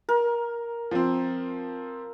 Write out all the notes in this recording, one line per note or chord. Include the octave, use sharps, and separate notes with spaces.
A#4
F3 C4